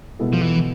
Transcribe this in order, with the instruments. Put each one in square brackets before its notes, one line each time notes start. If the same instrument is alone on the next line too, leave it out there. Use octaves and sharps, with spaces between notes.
[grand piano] B2 G#3 B3 E4 A4
[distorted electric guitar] F3
E3